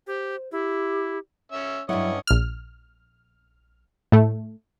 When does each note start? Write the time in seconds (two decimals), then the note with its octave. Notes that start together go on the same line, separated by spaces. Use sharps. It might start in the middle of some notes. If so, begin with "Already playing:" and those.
0.07 G4 C5
0.52 E4 G4
1.52 C#4 E5
1.89 G2 F#3 C#4 E4 C#5 D#5 F#5
2.27 A#1 F6
4.12 A2 A3